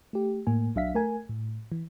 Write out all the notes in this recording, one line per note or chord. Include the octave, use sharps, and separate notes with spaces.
A3 G4
A2 A#3 G#5
B1 F#3 D4 E5 F5 B6
A3 A#4 G#5
A2
E3